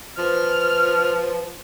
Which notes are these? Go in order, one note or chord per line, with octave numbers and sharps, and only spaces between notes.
F3 B4 F6